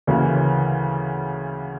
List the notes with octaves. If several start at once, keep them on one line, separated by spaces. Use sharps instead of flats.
D2 C#3 E3 A#3